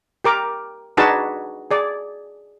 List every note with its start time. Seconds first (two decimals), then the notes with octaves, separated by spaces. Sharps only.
0.24 G4 A#4 D6
0.97 D4 D#4 F#4 G#4 B4 A5
1.71 G#4 D5